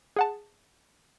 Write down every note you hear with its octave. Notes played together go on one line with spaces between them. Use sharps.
G#4 F#5 A5